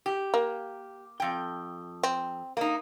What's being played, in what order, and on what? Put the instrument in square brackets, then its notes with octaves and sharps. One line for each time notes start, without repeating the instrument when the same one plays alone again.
[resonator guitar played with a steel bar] G4
[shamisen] A#3
[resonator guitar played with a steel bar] F2 G5
[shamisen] C4
[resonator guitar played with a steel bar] A#3 D#4